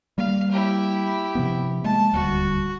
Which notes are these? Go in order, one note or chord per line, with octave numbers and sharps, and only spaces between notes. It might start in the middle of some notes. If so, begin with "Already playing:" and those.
G3 A#3 F5
E4 G4
C3 F3 B3
G#3 A#3 A5
D#1 D2 G3 F#4